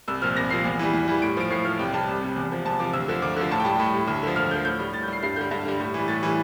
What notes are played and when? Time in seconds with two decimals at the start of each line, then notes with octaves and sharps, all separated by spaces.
0.08 C2 E6
0.22 A#2 F3 F6
0.37 C2 A#6
0.50 A#2 F3 C7
0.65 E2
0.79 E3 G3
0.93 E2
1.08 E3 G3
1.22 A2 D7
1.37 F3 D7
1.50 A2 C7
1.65 F3 F6
1.79 C2 G5
1.93 C3 G3 A5
2.08 C2
2.22 C3 G3
2.36 E2
2.51 C3 F3
2.65 E2 A5
2.79 C3 F3 D6
2.93 D2 E6
3.08 D3 F3
3.22 D2 D6
3.36 D3 F3
3.51 A2 A5
3.60 G5
3.65 G3 A5
3.79 A2
3.94 G3
4.08 D2
4.23 D3 F3
4.36 D2 F6
4.51 D3 F3 G6
4.65 A2 G6
4.80 G3
4.94 A2 A6
5.03 G6
5.08 G3 C7
5.23 G2 C7
5.36 D3 G3 G6
5.51 G2
5.65 D3 G3
5.80 A2
5.94 E3 G3
6.08 A2 A6
6.23 E3 G3